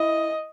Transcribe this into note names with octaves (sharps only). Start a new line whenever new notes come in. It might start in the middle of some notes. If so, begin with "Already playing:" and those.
Already playing: E4 D#5